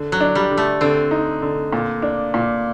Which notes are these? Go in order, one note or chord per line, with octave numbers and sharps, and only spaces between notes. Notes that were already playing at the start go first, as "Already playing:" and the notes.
Already playing: D3
F#3
D4
G3
D3
A3
D3 C4
D#4
D3
A#2
D4
A#2